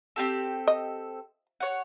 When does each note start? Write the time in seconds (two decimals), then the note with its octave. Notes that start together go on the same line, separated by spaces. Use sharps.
0.16 C4 G4 A4
0.67 D#5
1.60 C#5 F#5